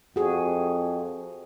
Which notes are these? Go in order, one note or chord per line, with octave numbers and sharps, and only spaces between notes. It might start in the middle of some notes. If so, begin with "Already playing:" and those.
F2 F#4 G#4